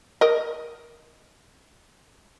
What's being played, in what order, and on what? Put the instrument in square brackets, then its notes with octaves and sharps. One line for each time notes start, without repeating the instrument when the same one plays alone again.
[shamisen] A#4 D#5